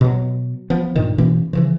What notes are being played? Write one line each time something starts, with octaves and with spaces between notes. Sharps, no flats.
B2 F#3
F3 B3
G2 A#2 D#3
B2 E3 A#3 C#4
C#3 E3 F3